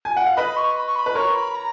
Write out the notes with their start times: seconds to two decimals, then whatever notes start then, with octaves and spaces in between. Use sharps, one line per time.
0.05 G#5
0.16 F#5
0.26 F5
0.37 B4 D#5 B5
0.56 C#6
0.76 B5
0.86 C#6
0.96 B5
1.06 B4
1.15 A#4 C#5 C#6
1.35 B5
1.55 A#5